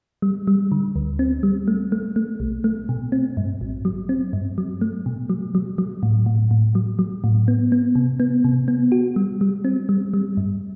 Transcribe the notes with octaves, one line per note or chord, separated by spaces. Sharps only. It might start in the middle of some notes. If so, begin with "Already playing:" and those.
G3
G3
D3
D2
C4
G3
A3
A3
A3
B1
A3
B2
C4
G2
A1
F#3
C4
G2
F#3
A3
B2
F#3
F#3
F#3
A2
A2
A2
F#3
F#3
A2
B3
B3
C3
B3
C3
B3
F#4
G3
G3
C4
G3
G3
G2